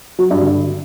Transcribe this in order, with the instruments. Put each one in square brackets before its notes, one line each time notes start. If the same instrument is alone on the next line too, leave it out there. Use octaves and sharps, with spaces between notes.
[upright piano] F#3
G2
D3